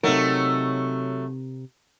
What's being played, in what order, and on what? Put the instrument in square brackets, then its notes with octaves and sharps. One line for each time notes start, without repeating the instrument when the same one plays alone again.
[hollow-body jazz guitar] C3 D#4 A#4 [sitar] F#3 A3